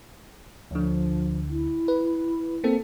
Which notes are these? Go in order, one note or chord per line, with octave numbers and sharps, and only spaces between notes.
D2 D3 F3
E4
B4
A#3 C4 A4